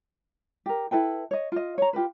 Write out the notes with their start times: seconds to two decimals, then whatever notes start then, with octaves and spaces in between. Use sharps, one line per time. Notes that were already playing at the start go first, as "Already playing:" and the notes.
0.66 G4 A#4
0.91 E4 A4 B4 G5
1.31 C#5 D#5
1.52 F4 D#5
1.78 C#5 A#5
1.93 F4 G4 A#4 B4